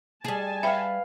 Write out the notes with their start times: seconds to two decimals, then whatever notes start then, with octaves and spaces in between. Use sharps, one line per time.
0.24 G3 G#4 G#5 A5
0.63 B4 E5 F5 G5